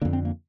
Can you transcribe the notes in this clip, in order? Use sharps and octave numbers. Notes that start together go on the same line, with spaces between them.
F2 D3 A#3
C4
A#3